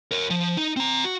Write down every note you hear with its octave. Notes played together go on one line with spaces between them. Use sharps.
A#4 C#5
F3
D#4
C4 A#5
F#4